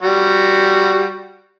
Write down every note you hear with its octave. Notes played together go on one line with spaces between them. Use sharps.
G3 F#4